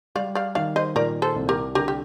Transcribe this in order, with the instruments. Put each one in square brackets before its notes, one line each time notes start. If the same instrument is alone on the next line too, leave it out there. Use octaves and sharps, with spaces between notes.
[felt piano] G3 [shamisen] D5 F5
[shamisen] D5 F5
[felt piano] D#3 [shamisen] D5 F5
[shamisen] C5 D#5
[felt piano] A#2 [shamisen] A#4 D5
[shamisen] A4 C5
[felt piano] C2
[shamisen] G4 A#4
[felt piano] D3 [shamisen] G4 A#4
[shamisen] G4